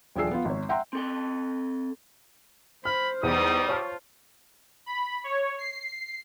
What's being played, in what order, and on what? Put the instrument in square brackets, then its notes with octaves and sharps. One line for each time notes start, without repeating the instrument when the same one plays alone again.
[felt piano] D#1 F3 D4 G#4 E6 C7
B3 F4
G#1 C#5
E5 F#5 G5 A#5 C6
[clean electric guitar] C4 A4 G5
[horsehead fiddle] C5 [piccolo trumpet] B5 [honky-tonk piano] F6
[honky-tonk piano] E2 [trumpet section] G3 D#6 [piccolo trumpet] D#4
[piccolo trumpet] F4 [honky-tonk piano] C#5 A5 F6
[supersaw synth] B5
C#5
C7